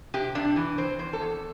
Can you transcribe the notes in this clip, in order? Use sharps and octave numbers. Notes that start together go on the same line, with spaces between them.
C3 G4
C3 D4
E3
C4 C5
E2 C5
A4
E2